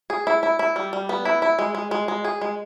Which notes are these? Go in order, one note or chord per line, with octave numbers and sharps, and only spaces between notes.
G#4
E4
E4
E4
G3
G3
B3
E4
E4
G#3
G#3
G#3
G#3
G#4
G#3